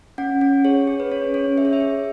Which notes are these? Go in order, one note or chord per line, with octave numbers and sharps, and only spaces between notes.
C#4 F#5
C#4
G#4 C#5
G#4
B4
C#4 C#5
C#4 C#5
G#4 E5
C#5
E5
G#4